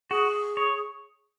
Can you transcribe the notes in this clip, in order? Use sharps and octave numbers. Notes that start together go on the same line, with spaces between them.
F#4 G#4
C#5